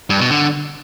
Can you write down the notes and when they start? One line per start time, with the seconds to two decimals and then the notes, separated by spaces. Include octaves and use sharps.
0.10 G2
0.20 B2
0.31 D3